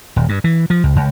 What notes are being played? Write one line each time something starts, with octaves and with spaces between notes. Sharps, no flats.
D#1
G2
E3
F3
C#2
C#2